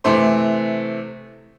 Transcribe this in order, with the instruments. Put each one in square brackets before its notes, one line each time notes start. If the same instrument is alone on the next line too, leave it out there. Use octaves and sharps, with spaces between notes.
[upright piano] C3 E3 A3 C4 C6